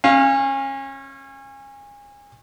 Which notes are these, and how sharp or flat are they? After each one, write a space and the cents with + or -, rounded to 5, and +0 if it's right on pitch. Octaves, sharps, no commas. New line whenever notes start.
C#4 -30 F5 +0